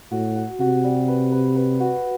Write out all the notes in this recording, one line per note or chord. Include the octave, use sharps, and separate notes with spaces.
A2 F#4
F#4
C3 F#4
G3
B4
B4
B4
F#4